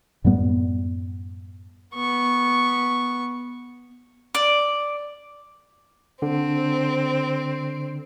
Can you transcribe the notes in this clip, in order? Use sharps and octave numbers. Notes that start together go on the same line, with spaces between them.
F#2 A2 G3 B3
B3 C#6
D5
D3 C4